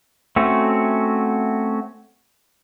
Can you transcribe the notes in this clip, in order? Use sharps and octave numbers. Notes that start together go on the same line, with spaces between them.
A3 C4 C#4 F#4